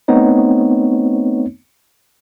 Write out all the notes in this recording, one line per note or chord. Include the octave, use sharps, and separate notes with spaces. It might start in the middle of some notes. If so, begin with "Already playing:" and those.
A3 B3 C4 D#4 C#5